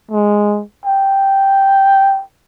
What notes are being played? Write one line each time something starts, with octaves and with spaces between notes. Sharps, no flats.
G#3
G5